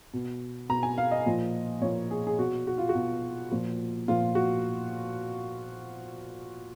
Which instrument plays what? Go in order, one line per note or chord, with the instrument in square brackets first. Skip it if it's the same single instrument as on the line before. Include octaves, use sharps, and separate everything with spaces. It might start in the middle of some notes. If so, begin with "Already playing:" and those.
[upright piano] B2
B2 A#5
G#5
F5
D#5
A#2 F3
A#2 F3 C#5
G#4
G#4
B2 F#4
F#4
F4
F#4
B2
A#2 F3
A#2 F3 F4
F#4